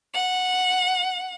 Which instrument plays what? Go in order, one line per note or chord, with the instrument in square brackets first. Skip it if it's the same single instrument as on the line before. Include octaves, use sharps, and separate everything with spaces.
[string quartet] F#5